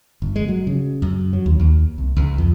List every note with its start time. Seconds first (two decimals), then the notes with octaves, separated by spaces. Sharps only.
0.22 G1
0.36 G#3
0.48 F#3
0.67 C#3
1.02 F#2
1.33 F#3
1.46 D#2
1.60 D#2
1.98 C2
2.17 C#2
2.38 F2